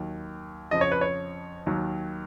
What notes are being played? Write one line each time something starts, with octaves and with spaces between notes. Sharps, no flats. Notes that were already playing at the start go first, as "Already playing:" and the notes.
Already playing: D#2 D#3 F#3
F2 C#3 F3 D#5
C#5
B4
C#5
D#2 D#3 F#3